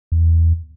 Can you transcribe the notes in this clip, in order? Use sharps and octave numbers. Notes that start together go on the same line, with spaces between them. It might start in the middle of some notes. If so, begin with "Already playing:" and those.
E2